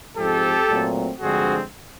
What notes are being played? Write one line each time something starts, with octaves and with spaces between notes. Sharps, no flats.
G#2 F3 G#3 C4 G4 A4
A#2 F#3 A3 C4
G2 D3 F3 G#3 C4 F#4 G#4